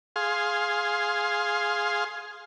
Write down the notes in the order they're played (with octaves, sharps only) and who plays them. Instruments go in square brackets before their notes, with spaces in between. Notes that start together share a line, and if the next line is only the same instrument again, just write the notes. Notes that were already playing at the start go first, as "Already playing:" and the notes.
[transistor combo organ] G#4 F5 C6